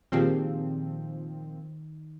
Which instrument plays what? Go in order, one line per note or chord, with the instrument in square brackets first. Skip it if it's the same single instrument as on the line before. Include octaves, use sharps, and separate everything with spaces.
[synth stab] A#2 F3 C4 [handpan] D#3 [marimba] F4 G4 G#4